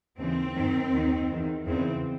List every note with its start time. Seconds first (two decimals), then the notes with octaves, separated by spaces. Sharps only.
0.18 D#2 C#3 E3 C4
0.55 F#2 D#3
0.92 D#2 D#3
1.29 E2 D#3
1.66 E2 C#3 E3 C4